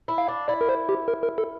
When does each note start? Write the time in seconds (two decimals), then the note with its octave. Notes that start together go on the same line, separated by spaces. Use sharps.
0.08 E4
0.18 F5
0.28 D4
0.48 E4 D5
0.61 A#4
0.69 C5
0.89 G4
1.08 A#4
1.23 A#4
1.38 A4